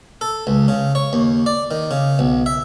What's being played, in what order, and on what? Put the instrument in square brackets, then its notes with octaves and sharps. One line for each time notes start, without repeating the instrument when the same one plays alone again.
[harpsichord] A4
C#2
C#3
C#5
D#2
D5
D#3
C#3
B1
E5